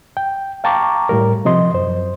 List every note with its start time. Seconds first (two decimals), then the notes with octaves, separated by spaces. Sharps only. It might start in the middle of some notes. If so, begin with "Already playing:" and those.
0.17 G5
0.64 F5 G5 A5 A#5 C#6 D6
1.09 A2 G3 A#4
1.45 C3 F3 D#5 C6
1.74 F#2 C5